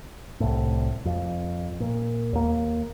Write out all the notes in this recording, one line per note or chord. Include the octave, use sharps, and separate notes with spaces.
C2 A2
F2
A#2
D#2 A#3